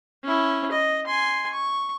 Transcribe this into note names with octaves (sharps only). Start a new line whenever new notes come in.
C#4 E4
D#5
G#5 C6
C#6